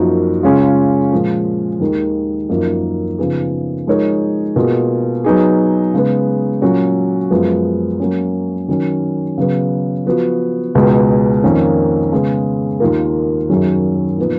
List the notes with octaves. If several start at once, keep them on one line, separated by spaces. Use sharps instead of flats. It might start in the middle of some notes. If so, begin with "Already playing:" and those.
Already playing: F#2 F3 A#3 D#4 F#4
C#3 G#3 C#4 F4 G#4
A#2 F3 G#3
D#2 D#3 G#3
F#2 F3 A#3 D#4
C#3 F3 B3 D#4 G#4
F3 G#3 D#4 A#4 C#5
B2 A#3 F4 G#4
F#3 B3 D#4 G#4
C#3 G#3 B3
A#2 F#3 C#4 F#4
F#2 F3 G#3 B3
F#3 A#3 C#4
D#3 F#3 C#4
C#3 F#3 B3
F3 B3 F#4
C#2 B2 G#3
F2 D#3 A#3 C#4
C#3 G#3 B3
D#2 D#3 A#3 F4 A#4
F#2 D#3 F#3 C#4 G#4
A#2 F3 B3 D#4